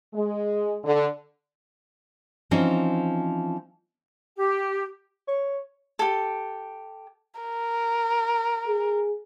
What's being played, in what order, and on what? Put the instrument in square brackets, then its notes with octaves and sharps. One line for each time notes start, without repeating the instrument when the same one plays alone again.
[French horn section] G#3
D3
[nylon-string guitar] E3 F3 C4 C#4 D#4
[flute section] G4
[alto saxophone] C#5
[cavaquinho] G4 A4
[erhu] A#4
[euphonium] G#4